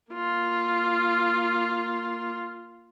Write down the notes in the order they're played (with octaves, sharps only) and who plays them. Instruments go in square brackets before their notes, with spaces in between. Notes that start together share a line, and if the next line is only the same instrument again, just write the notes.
[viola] A#3 F4